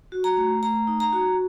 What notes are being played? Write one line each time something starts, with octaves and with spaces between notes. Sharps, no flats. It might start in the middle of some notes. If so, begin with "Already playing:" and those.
F#4
A#5
A3
A3 A#5
D#4
A#5
F#4